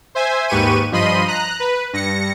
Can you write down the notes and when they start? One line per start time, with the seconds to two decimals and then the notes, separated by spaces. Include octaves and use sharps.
0.15 C5 E5 G#5
0.48 D#2 G#2 G4 B4 C#6 D#7
0.92 G2 F3 D#5 B5 C6 D#7
1.28 A#5 F#6
1.60 B4
1.93 G2 A#6 C#7